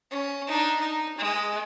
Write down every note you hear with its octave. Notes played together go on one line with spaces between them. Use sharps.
C#4
D4 D#4
D#4
G#3